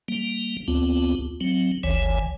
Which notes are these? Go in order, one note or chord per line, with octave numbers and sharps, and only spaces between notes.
G3 A#3
D2 B3 C4 F4
F#3 C4
G1 D2 E3 C#5 G#5